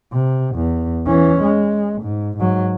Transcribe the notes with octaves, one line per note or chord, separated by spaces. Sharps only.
C3
E2
E3 C#4
G#3
G#2
G#2 F#3